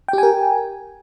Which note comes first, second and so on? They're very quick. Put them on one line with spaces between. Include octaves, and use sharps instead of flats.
G5 G4 G#5 A#4